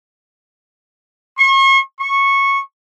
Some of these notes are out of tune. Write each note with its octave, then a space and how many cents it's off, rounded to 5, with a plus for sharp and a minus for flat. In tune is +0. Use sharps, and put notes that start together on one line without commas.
C#6 -40
C#6 -10